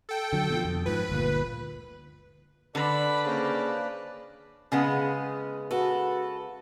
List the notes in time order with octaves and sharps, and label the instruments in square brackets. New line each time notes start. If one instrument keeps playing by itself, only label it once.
[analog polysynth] A4 G5
[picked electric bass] D3 F#3
B2 D3 F3
F2
[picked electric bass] G#2 F3 [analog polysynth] B4
[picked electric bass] G1 D2 A#2
[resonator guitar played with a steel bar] D3 [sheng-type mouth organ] B4 D5 A5 [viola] B5
[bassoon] C#3 [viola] A#3 C5
[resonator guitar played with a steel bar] C#3 G#3 B3
[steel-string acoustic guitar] F#4 A4 B4